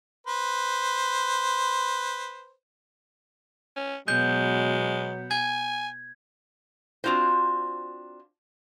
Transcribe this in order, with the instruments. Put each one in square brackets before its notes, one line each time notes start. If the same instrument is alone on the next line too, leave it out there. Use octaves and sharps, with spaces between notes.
[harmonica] B4 C5
[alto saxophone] C#4
[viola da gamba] B2 B3 [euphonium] F#3 [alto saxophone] G#3 [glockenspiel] G6
[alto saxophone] G#5 [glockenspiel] G#6
[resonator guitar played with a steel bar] C4 D4 F4 F#4 C5